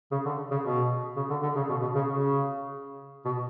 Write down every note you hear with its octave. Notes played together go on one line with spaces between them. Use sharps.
C#3
D3
C#3
B2
C#3
D3
D3
C#3
B2
B2
C#3
C#3
B2